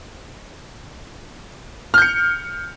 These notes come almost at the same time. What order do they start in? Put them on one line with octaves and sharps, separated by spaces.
F6 G6 C#7